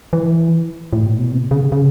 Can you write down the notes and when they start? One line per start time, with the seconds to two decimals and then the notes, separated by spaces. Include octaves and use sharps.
0.13 E3
0.93 A2
1.06 A#2
1.18 B2
1.32 C3
1.51 C#3
1.72 C#3